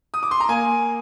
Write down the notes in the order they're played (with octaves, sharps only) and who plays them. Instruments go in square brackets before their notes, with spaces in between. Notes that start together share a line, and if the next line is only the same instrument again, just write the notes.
[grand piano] D#6
D6
C6
A#5
A#3 G#5